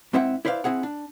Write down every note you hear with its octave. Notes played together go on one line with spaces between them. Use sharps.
G#2 C4 E4 E5 F#5
E4 B4 C5 D5 F5
C4 E4 G#4 F#5
D4